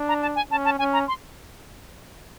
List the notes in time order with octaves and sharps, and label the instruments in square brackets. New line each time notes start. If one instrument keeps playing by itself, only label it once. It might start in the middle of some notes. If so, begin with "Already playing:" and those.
Already playing: [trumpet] D4
[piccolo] A#5
A5
G#5
[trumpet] C#4 [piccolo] A5
[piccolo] A5
[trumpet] C#4 [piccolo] G#5
[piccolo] A#5
C6